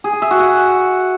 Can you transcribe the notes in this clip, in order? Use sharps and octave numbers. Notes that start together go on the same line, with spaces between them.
G#4
G#5
E5
F#4
F#5